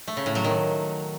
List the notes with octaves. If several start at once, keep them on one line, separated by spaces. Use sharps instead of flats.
A3
C#3
A2
F#3
D#3